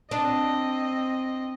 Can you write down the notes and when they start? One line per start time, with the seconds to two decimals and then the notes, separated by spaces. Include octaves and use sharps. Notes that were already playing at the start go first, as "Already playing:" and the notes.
0.11 C4 D4 D#5